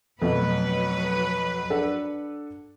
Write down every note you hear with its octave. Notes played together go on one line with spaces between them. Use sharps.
F2 B2 F#3 A3 B4
D4 A4 F#5